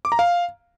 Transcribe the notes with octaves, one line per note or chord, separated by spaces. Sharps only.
D6
A#5
F5